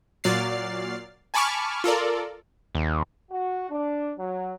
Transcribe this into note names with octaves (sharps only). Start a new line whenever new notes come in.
A#2 F#3 D5 F6 A6 C7
G#5 A5 B5 C#6 D6 F6
F4 A4 A#4 D5
D#2
F#4
D4
F#3